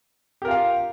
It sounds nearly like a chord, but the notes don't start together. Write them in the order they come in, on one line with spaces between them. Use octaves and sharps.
G4 A#4 F4 F5